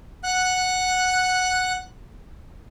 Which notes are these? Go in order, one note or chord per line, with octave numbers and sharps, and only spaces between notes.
F#5 F#6